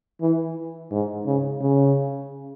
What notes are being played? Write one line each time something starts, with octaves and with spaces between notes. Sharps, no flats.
E3
G#2
C#3
C#3